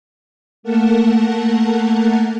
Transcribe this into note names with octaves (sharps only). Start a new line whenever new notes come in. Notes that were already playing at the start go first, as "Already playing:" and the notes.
A3 A#3 A#4 F#5 A5